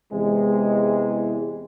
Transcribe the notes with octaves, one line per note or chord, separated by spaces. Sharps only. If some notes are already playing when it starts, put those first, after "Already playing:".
E2 C3 E3 G#3